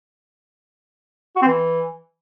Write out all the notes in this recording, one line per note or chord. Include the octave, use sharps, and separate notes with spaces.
F#4
C4
E3